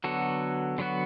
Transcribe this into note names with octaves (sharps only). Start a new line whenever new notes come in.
D3 F#3 B3 F#4 A4
D3 F#3 B3 F#4